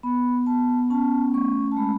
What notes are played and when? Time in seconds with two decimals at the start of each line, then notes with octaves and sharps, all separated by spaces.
0.03 B3 B5
0.46 B3 A5
0.90 C#4 A5
1.34 A3 C#6
1.72 A5
1.77 G#3 B5